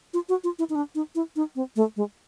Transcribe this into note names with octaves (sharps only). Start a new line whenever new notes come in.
F4
F#4
F4
E4
D#4
D4
D#4
E4
D#4
C4
A3
G#3